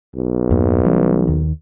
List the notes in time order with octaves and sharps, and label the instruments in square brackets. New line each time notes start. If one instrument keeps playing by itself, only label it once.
[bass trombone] B1
[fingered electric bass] E2 G2 A#3
E3 G3 C#4
D#2 D#3